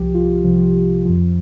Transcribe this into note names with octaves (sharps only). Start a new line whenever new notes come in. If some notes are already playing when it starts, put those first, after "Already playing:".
Already playing: C2 C3 F3 G4
F4
C2 C3 F3
F2 F3